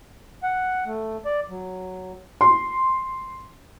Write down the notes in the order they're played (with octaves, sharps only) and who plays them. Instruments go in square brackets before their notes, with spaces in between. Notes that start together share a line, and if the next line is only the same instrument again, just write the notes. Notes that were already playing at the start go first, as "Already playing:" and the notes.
[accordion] F#5
A3
D5
F#3
[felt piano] C6